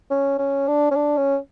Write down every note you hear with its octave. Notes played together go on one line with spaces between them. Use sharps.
C#4
C#4
D4
C#4
D4
C#4